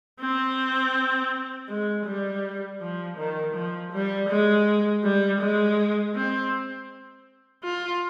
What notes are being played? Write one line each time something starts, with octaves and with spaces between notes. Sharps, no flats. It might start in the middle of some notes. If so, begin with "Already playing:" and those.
C4
G#3
G3
F3
D#3
F3
G3
G#3
G3
G#3
C4
F4